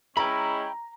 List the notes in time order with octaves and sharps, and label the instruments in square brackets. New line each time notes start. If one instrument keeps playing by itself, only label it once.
[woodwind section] G#3 C#4 E4 [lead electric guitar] G5 B5 [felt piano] A#5